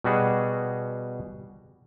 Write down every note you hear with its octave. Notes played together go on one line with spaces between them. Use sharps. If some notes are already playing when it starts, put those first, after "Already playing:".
B2 G3 F#4 G#4